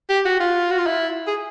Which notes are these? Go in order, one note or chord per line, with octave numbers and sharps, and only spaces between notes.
G4
F#4
F4
F#4
F4
E4
G#4